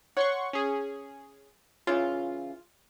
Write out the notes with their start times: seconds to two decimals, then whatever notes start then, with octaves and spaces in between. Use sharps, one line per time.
0.17 C#5 F#5 C6 C#6
0.53 C#4 G#4
1.87 C#3 E3 F4